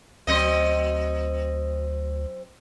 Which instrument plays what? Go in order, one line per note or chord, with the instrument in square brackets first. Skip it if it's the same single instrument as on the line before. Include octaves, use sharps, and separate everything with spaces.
[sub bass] D2 [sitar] F#3 C4 D#5